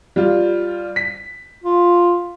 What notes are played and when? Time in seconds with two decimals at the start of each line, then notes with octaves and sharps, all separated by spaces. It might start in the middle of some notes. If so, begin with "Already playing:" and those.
0.16 G3 F4
0.96 B6
1.64 F4